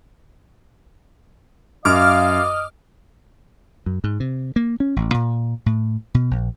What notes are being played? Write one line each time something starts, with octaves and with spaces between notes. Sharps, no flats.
F#2 D#5 F5 D6 F6
F#2
G#2
C3
A#3
C#4
A1
A#2
A2
B2
A#1